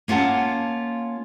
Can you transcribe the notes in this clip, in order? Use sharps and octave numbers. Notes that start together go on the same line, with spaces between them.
A#3 C#4 F4 F#5 A5